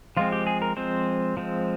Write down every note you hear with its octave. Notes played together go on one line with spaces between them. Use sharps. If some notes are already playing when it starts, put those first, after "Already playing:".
F3 G#3 C4 F4
G4
G#4
A#4
F3 G#3 C4 C5
F3 G#3 C4